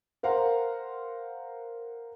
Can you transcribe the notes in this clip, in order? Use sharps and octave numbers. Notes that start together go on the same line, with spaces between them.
A#4 C5 F5 F#5 A#5 C6